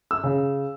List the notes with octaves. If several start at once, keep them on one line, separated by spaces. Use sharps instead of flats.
E6
C#3